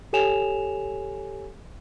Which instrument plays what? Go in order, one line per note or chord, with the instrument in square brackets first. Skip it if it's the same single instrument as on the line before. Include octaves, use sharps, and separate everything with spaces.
[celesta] G4 A4 C#5 G#5 E7 F7